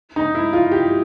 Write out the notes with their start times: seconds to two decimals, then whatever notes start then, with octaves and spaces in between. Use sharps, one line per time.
0.16 D#4
0.35 E4
0.53 F4
0.72 G4